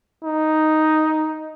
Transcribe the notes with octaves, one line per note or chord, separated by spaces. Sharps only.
D#4